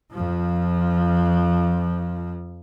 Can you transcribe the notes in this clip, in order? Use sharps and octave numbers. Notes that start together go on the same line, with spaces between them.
F2 F3